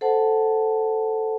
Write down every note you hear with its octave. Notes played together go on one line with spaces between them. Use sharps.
A4 C5 F#5 A5